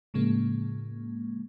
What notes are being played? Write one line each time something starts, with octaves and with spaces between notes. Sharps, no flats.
A2 C#3 F3 G#3 A#3